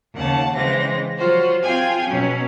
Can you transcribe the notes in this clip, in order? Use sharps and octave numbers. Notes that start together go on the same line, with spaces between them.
D#2 C#3 F#5 A5
C#3 E3 G#3 C4 A#6
F#3 F4 F#4 C5
C4 F4 G#4 G5 G#5 G#6
B2 F#3 C#4